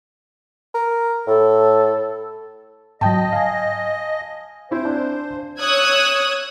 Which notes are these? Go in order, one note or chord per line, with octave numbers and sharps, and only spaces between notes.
A#4
A2 A4
G#2 F#3 D#5 G5 A5
F5 G#5
C4 E4 C5
D4
C#5 D#6 E6 F#6 G#6